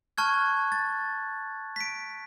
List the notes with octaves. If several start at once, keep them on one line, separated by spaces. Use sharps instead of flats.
A5 C#6 F6 F#6 G#6
A6
B6 D7